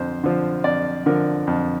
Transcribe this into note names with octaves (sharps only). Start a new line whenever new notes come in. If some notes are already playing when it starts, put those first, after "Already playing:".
Already playing: F2 D3 C5
D3 F3
F2 D5
D3 F3 A#4
F2